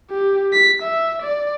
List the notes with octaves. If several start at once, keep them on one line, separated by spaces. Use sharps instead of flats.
G4
B6
E5
D5